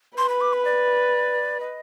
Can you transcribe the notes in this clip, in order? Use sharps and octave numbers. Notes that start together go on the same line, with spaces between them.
B4 C6
B5
D6
B5
D5
D#5